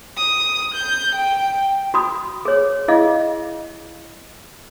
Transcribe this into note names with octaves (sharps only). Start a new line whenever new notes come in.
D#6
G6
G5
F#4 B5 D#6
G#4 C#5
E4 G#4 D#5 F5